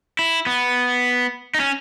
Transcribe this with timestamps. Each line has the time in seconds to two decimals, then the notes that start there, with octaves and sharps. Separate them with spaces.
0.19 E4
0.46 B3
1.54 D#4
1.60 C#4